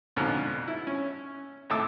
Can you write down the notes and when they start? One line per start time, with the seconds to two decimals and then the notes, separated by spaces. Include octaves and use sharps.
0.16 F2 G#2 B2 D3 F3
0.68 E4
0.87 C#4
1.70 G#1 A2 A3 A4 D6 E6